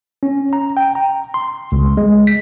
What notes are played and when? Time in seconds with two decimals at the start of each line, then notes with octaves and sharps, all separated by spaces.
0.23 C#4
0.53 A#5
0.77 G5
0.95 A#5
1.34 C6
1.72 C#2
1.97 G#3
2.27 B6